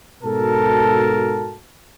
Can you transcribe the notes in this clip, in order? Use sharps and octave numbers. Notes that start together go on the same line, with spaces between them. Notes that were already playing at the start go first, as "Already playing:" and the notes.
G#2 B2 F#4 A4 A#4 A5